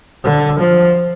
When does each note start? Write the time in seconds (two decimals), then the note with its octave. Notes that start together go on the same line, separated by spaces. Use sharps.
0.24 D3
0.60 F3